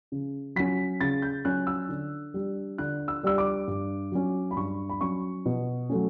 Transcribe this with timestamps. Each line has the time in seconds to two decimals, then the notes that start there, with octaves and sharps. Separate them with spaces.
0.12 C#3
0.56 F#3 C#4 B6
1.01 C#3 A6
1.22 G6
1.45 F#3 C#4 F#6
1.67 E6
1.89 D3
2.34 G3 D4
2.78 D3 F#6
3.08 E6
3.23 G3 D4 E6
3.38 D6
3.67 G2
4.12 F#3 C#4
4.51 B5
4.56 G2 C#6
4.89 B5
5.01 F#3 C#4 C#6
5.46 B2
5.90 F#3 A3 C#4